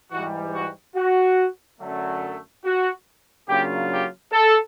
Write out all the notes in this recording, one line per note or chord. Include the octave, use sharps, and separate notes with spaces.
G#2 E3 G3 F#4
F#4
F#4
F#2 D3 F#3 A3
F#4
C#3 F#3 A#3 D4 F4 G4
G4
A4